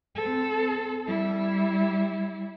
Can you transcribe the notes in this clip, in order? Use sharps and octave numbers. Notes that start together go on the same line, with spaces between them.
C4 A4
G3 E4